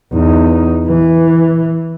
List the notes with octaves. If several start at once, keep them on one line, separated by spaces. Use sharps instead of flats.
E2 D#4
E3